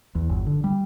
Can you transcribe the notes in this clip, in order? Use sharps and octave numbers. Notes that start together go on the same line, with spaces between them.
E2
G1
D3
G3